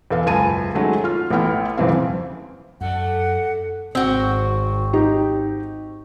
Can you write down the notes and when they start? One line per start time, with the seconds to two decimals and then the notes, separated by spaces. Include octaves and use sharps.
0.11 E2 A4 F5
0.26 F#1 C#2 G#5 A5 D#7
0.75 D#3 F#3 G#3 A3 C#4
1.04 F4 F6
1.30 A1 A3 B3 E4 G5 F6
1.77 D#1 F2 C#3 E3 C4 F5
2.81 F#2 A3 A4 D5 F#5
3.95 G#1 C4 F#4
4.93 D#4 G4